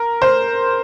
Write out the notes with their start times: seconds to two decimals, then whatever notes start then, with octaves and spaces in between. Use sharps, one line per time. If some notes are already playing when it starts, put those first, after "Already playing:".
Already playing: A#4
0.22 C5